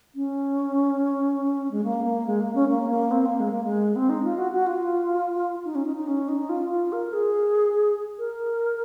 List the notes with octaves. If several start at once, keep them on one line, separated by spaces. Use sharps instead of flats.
C#4
G#3
A#3
A#3
G#3
A#3
C#4
A#3
A#3
C4
A#3
G#3
A#3
G#3
C4
D#4
F4
F#4
F#4
F4
D#4
C#4
D#4
D#4
C#4
D#4
F4
F4
A#4
G#4
A#4